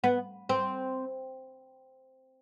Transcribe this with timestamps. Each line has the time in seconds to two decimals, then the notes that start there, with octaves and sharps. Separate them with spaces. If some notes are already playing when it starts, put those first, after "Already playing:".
0.04 B3
0.49 C4